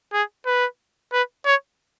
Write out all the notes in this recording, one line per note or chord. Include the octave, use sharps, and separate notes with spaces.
G#4
B4
B4
C#5